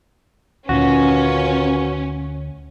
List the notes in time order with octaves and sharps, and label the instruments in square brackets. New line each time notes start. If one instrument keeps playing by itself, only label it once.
[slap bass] D2 A#2 [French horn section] D#3 F4 B4 [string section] C#4 [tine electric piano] F#4